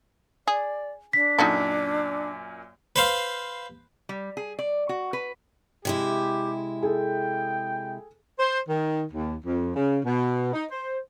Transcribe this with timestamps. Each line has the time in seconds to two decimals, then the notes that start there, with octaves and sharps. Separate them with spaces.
0.48 G#4 D5
1.13 D4 B6
1.39 F#2 A#2 D#4 F#4 A4
2.96 B4 C5 F5
4.09 G3
4.37 G#4
4.59 D5
4.89 F#4
5.13 B4
5.85 C3 G#3 E4 G4
6.82 G#4 A4 G5
8.39 C5
8.69 D#3
9.12 D#2
9.44 F2
9.75 C#3
10.04 B2
10.54 D#4
10.70 C5